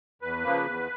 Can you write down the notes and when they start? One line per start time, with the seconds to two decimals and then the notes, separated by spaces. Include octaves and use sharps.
0.22 E2 B4
0.44 C#3 F3 A#3
0.65 E2